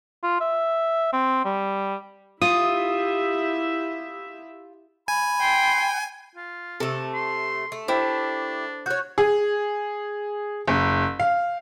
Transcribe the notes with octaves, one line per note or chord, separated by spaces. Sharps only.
F4
E5
C4
G3
E4 F4 G4 E5 D#6
G#5 B5
G5 C6
F4
C3 A3 A4
C6
A3
D4 E4 G4 C5
F#4 C#5 F#6 G6
G#4
F#1
F5